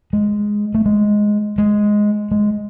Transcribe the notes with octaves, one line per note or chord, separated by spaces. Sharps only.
G#3
A3
G#3
G#3
G#3